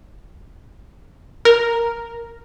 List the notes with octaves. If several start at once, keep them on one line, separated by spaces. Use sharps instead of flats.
A#4